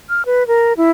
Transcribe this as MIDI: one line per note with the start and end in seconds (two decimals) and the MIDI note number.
0.09 0.22 89
0.26 0.46 71
0.47 0.73 70
0.77 0.91 64